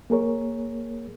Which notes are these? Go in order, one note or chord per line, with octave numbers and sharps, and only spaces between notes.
A#3 G#4 A#4 C#5